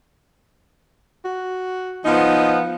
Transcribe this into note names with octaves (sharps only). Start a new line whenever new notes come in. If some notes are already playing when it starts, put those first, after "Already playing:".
F#4
F3 B3 D#4